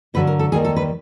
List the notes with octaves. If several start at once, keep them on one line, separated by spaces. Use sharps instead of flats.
G2 D3 F#3 B4
A#4
A4
D#2 D#3 G3 A#3 G#4
A4
B4